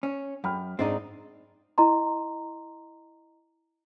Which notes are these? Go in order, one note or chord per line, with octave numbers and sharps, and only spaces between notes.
C#4
F#2 G5 B5 F6
G#2 C4 D4 D#4 D#5
E4 D#5 A#5 C6